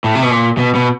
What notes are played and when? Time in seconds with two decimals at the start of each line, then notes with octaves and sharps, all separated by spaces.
0.04 A2
0.15 C3
0.22 B2
0.31 A#2
0.57 B2
0.75 B2